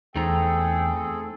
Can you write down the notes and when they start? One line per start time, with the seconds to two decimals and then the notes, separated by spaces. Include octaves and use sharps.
0.16 E2 A3 C4 D#4 G#4 A4 G5 A#5